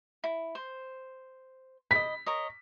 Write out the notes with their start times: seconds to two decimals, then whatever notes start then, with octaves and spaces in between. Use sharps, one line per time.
0.24 E4
0.55 C5
1.91 D#5 B5 B6
2.26 A#4 C#5 D#5